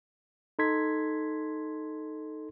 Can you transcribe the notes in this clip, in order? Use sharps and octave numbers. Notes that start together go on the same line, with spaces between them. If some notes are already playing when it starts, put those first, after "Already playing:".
D#4 A4 C6 G#6 B6